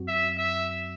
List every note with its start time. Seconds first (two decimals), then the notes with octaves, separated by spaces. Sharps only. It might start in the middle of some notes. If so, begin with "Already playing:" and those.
Already playing: F#2 F#3 C4 F#4
0.08 E5
0.38 E5